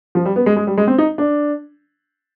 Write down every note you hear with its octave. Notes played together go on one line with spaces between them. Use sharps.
F3
G3
B3
G#3
G#3
G3
G#3
C4
D#4
D4